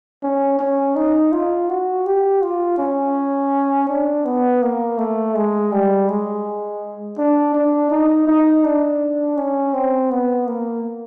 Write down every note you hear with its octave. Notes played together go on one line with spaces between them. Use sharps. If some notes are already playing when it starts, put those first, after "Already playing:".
C#4
C#4
D#4
F4
F#4
G4
F4
C#4
D4
B3
A#3
A3
G#3
G3
G#3
D4
D4
D#4
D#4
D4
C#4
C4
B3
A#3